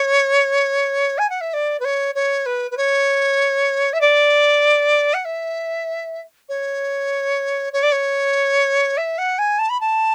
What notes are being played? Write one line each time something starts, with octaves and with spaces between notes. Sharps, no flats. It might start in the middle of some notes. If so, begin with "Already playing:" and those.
Already playing: C#5
G#5
F#5
E5
D5
B4
C#5
C#5
B4
B4
C#5
E5
D5
F#5
E5
C#5
C#5
D5
C#5
E5
F#5
G#5
A5
B5
A5